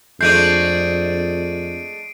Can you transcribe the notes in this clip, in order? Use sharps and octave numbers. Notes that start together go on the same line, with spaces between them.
F2 G#3 A3 D4 G6 C7 D7 D#7